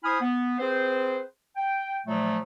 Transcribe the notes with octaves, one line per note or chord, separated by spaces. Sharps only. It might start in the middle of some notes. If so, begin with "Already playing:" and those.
E4 C5 G#5 B5 D#6 F6
B3
C4 G#4 B4 C5
G5
A#2 F3 F#3 A3